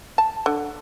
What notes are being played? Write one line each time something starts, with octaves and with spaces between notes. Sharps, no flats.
A5
D3